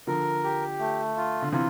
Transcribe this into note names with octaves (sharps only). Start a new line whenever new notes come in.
D3 F3 A#4
G4
A3
F4
D3
C3 E3 F4